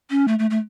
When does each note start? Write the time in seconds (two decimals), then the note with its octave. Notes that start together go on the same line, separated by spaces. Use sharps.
0.10 C#4
0.28 A3
0.39 A3
0.50 A3